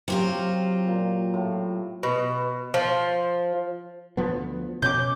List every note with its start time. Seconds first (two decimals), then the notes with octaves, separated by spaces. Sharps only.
0.08 C3 F#3 F4 G4 D6
0.87 A#2
1.34 A2
2.03 B2
2.74 F3
4.17 D2 F3 B3
4.82 B2 C#4 D6 G6